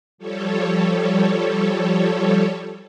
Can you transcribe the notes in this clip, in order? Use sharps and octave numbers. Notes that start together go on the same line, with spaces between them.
F3 G3 A4 C#5